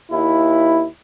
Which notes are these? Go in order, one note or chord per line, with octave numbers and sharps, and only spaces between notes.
D#2 E4